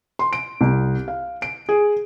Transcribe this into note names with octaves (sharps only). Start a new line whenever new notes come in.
C6
D7
C2
F5
D7
G#4